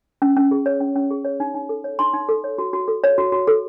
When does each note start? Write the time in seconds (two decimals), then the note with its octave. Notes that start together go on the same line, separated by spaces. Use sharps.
0.22 C#4
0.36 C#4
0.51 G#4
0.66 C#5
0.81 C#4
0.96 C#4
1.10 G#4
1.25 C#5
1.40 D#4
1.55 D#4
1.69 A4
1.84 C#5
1.99 D#4 C6
2.14 D#4
2.29 A4
2.44 C#5
2.58 F#4
2.73 F#4
2.88 A4
3.04 C#5
3.18 F#4
3.32 F#4
3.47 A4